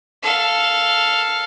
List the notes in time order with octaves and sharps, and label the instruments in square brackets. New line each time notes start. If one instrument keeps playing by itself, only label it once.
[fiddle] A4 F5